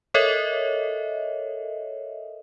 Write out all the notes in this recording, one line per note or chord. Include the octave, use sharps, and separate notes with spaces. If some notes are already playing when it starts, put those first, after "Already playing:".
A4 A#4 C#5 D#5 E5